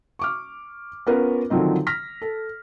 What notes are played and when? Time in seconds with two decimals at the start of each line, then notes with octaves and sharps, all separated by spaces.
0.19 C#6 D6 F6
1.07 B3 C#4 F4 A#4 B4
1.50 D3 D#3 F3 F#3 C4 D#4
1.87 F6 A#6 B6
2.22 A4